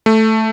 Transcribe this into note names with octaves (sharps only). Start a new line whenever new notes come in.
A3